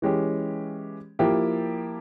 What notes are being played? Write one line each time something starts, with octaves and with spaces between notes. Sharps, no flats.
E3 G#3 C#4 G4
F3 A#3 E4 G4